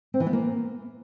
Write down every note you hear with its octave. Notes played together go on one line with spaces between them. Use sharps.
C4
E3
B3
A#3